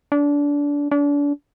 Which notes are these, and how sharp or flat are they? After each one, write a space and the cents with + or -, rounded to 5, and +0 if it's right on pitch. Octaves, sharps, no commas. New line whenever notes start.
D4 -25
D4 -35